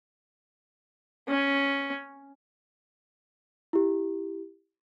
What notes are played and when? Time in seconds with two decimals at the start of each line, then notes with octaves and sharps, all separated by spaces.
1.28 C#4
3.73 E4 G4